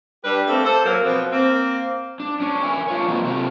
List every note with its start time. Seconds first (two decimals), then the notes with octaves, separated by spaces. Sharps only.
0.23 G3 D4 G4 B4
0.47 A3 A#3 C4 A4
0.63 A4 C5
0.84 F#3 A#3
1.02 B2 F3 B3 C4
1.31 A#3 C4
2.20 D4
2.40 C#4 D4
2.63 A#4 E5 G#5
2.88 D4 F4 C#5
3.08 E3 A#3 C4 D#4 F4 F#4
3.23 C3 A3 A#3 F4